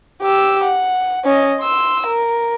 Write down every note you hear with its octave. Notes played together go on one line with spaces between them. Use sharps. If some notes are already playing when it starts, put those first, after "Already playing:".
G4 E6
F#5
C#4 D#5
C6 E6
A#4